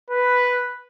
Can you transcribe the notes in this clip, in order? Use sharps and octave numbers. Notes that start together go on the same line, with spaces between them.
B4